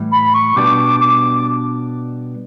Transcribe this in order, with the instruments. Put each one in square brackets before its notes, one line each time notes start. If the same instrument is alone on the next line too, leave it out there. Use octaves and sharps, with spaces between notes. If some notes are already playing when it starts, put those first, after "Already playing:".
Already playing: [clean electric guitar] A2 E3 G3
[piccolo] B5
C#6
[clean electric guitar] B2 G3 B3 D4 [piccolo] D6
[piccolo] D6